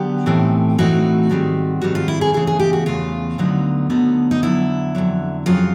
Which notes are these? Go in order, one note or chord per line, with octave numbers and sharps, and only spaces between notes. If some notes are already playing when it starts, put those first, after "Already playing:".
Already playing: D3 F#3 B3 G4
A2 E3 A3 C4 D#4
A2 E3 A3 C4 D#4 F#4
G#2 D#3 G3 C4
G#2 D#3 G3 C4 F#4
F4
E4
G#4
E2 C#3 E3 A3 G#4
G#4
G4
F#4
E2 C#3 E3 A3 F4
D2 D3 F#3 B3 D#4
D2 D3 F#3 B3 D#4
D#4
F2 D3 F#3 E4
F2 D3 F#3
F2 C#3 F#3 F4